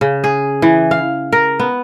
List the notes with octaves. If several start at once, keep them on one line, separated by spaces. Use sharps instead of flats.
C#3
G#4
E3
F5
A#4
B3